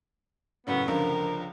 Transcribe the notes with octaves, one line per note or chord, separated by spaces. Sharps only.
F#2 A2 C#3 B3
C#2 D3 F3 A#4